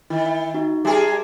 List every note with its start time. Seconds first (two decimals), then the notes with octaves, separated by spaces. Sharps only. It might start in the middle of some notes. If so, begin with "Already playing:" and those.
0.10 D#3 E4
0.26 E5
0.54 D#4 F#4
0.85 G3 G4 G#4 A#4 E5 A5